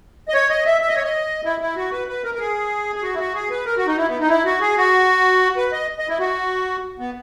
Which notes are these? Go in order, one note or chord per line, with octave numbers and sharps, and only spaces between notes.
D#5
C#5
D#5
E5
E5
D#5
C#5
D#5
E4
E4
F#4
B4
B4
A#4
A#4
G#4
G#4
F#4
E4
F#4
G#4
B4
A#4
F#4
D#4
E4
B3
D#4
E4
F#4
G#4
F#4
B4
D#5
D#5
E4
F#4
B3